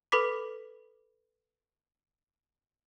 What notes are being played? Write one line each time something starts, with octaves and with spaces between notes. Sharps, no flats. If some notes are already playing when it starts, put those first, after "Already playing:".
A4 B4 B5 D6 B6